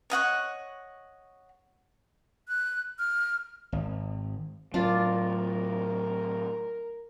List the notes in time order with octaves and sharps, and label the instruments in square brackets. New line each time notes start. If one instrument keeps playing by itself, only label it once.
[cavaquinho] C#5 D#5 F#5 C#6
[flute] F#6
F6
[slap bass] G#1
[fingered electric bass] A2 F#3 [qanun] D4 F4 [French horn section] A#4